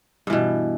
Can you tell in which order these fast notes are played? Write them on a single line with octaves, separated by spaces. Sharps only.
G2 E3 B2